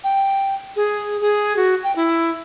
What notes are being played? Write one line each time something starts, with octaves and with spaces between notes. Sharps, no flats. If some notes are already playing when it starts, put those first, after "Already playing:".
G5
G#4
G#4
F#4
G5
E4